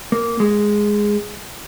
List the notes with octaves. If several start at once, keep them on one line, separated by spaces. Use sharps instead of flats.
A#3
G#3